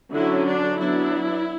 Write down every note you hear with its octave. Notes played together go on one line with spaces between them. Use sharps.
D3 F#3 C#4 E4
D4
F#3 B3 D4 E4